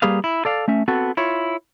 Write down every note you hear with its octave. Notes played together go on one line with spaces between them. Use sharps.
G3 A#3 G4 G#4 B4 F5
E4
A4 D5 F5
A3 C#4 E5
B3 C4 F#4 A4
E4 F4 C#5